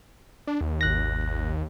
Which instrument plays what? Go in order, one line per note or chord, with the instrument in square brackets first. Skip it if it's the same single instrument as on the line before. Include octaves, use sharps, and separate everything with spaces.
[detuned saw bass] D4
D#2
[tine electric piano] G#1 F#6 A#6